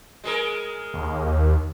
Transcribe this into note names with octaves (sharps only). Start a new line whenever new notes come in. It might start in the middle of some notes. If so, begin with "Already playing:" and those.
G#3 G#4 A#4
D#2